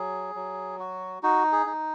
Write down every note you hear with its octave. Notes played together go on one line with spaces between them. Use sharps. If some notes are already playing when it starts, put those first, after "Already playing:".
Already playing: F#3 G#4
F#3
F#4
D#4 F#4
G#4
D#4